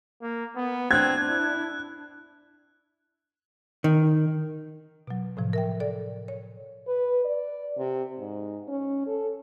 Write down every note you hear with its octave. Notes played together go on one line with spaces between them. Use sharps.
A#3
B3
C4 D4 F#6 G#6
E4
D#3
B2 F#3
A2 C3 F3
A#4 E5 G5
A4 D5
C#5
B4
D5
C3
G#2
C#4
A4